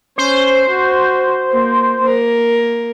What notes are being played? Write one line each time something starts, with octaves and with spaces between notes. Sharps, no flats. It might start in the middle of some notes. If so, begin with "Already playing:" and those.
C#4 C5
F#4
A#3
A#3 A#4